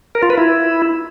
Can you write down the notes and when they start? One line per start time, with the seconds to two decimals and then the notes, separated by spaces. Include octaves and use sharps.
0.15 A#4
0.22 F4
0.30 B4
0.37 E4